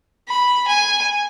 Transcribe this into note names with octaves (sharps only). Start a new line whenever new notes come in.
B5
G#5